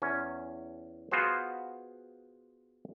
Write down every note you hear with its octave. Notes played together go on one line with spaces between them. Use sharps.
E2 C#4
B3 F4 F#4 G#4 C5